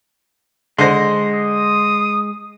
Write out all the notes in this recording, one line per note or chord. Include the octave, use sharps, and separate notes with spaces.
D3 G#3 C5 C6 A#6
D#6